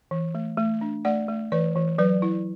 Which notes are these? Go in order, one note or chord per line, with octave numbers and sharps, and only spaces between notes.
E3
A3
A3
D4
A3 D5 F#5
A3
E3 B4 D5
E3
F#3 B4 D5
E4